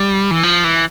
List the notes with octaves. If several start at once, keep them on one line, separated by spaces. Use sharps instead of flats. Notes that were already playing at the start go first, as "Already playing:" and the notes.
Already playing: G3
E3
F3
E3